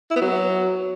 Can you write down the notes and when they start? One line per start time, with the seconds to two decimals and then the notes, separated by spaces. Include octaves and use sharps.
0.11 E4
0.16 B3
0.21 F#3